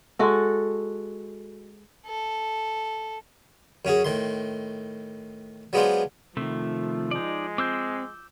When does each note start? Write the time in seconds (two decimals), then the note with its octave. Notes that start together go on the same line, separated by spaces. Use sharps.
0.19 G#3 F#4 A4
2.06 A4
3.85 F#2 C#4 F#4 G#4
4.04 A2 D#3 C6
5.73 F#3 G#3 B3 D4 F4 C5
6.37 C3 D#3 F3 A3
7.11 G#3 D#4 D5
7.58 C4 D6 E6 G6